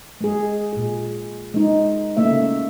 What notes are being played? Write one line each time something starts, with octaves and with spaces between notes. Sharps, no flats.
G#3 G#4
A#2 G#4
G#3 D#4
C#3 A3 A#3 E5